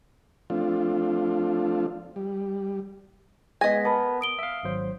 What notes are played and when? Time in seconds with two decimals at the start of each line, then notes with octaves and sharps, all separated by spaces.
0.50 F3 A3 C4 D4 F4
2.16 G3
3.61 G#3 B3 D#5 G#5 A#6 B6
3.85 B3 A#4 A5 B5
4.21 D#6 D7 G7
4.39 E5 F5
4.63 G#1 F#3 C5